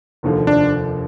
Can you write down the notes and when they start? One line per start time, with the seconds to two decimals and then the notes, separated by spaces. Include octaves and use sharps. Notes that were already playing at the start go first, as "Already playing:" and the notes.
0.23 F1 D#2 D3 F3
0.47 D4